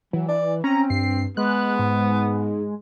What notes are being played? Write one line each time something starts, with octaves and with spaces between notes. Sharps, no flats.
E3 F#3
D5
C4 C#4 A#5
G2 C7
G#3 B3 F#6
G#2